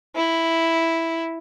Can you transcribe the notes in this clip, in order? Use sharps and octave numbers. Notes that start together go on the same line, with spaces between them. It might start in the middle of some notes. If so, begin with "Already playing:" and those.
E4